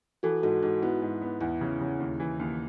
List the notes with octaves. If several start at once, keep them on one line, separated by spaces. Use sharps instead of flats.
E3 F#4 A4
G#2 F#4 A4
G#2 F#4
B3 E4
G#2
B3
E2 E4
C#3
C#3
D#2
E3
D#2